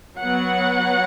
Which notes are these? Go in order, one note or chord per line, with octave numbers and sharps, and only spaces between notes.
F#3 B3 F#5